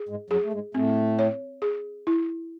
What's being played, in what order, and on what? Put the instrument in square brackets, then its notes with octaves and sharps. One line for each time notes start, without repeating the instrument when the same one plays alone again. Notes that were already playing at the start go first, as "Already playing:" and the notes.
Already playing: [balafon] G#4
[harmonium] G#2 G#3
[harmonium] F#2 F#3 [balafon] G#4
[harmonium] A3
G#2 G#3
[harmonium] A2 A3 [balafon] C4
[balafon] C#5
G#4
E4